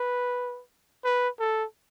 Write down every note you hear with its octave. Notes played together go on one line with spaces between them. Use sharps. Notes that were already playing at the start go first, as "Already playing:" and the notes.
Already playing: B4
B4
A4